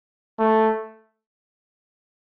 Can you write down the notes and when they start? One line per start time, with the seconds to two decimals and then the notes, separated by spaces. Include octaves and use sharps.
0.39 A3